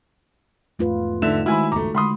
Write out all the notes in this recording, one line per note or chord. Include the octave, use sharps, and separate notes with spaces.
E2 G#2 A3 F4 B4
D3 A3 D#4 E5 E7
D#3 G#3 E4 F#4 G#5 B5
G#1 C#2 F#2 A3 A#5 D6
D3 G#3 B5 C6 D#6